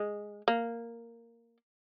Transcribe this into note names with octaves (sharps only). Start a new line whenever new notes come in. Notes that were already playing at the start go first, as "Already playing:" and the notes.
Already playing: G#3
A#3